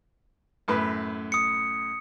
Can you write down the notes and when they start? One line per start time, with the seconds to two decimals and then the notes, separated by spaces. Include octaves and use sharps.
0.68 F#2 A2 B4
1.32 D#6 C#7